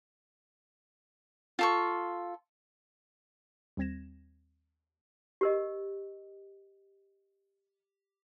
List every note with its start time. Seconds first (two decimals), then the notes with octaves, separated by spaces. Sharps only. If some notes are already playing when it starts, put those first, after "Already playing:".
1.59 F4 A4 C#6
3.77 D#2 G3 C4 G#6 A#6 E7
5.41 G4 A#4 D#5